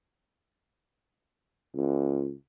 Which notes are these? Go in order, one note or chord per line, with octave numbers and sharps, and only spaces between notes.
C#2